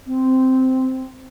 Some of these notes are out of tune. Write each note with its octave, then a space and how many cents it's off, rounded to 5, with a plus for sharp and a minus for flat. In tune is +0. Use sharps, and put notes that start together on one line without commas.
C4 -10